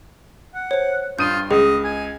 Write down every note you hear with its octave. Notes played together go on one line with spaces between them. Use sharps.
F#5
C5 C#5
G2 F4 D#6 G6 D#7
C#2 G#4 D#5
G#5